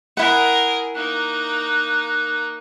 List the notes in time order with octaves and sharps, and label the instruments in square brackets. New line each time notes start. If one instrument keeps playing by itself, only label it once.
[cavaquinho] E4 F#5 [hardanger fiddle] G#4 A#4
[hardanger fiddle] A#3 D#4 [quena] F#6